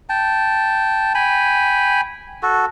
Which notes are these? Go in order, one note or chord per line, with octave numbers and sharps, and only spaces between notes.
G5 A5
G5 G#5 B5
F#4 A4